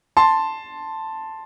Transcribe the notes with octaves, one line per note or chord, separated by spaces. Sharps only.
A5 C6